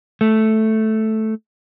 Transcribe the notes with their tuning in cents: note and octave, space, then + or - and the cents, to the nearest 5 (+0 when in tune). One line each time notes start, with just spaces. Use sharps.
A3 -5